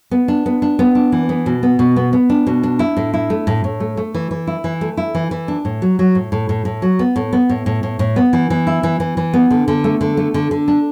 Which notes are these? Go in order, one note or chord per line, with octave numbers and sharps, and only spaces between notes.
B3
D4
B3
D4
B3
D4
E3
B3
B2
B3
B2
B3
B3
D4
B2
D4
E4
A2
E4
A3
A2
A2
A3
A3
E3
E3
E4
E3
A3
E4
E3
E3
D4
A2
F#3
F#3
A2
A2
A2
A2
F#3
B3
A2
B3
A2
A2
A2
A2
B3
E3
E3
E4
E3
E3
E3
B3
D3
D3
A3
D3
A3
D3
D3
D4